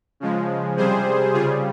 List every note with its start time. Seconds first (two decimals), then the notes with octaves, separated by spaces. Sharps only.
0.20 C#3 F3 G#3
0.77 C3 G3 G#4 C5
1.33 C#3 G3 F4 G#4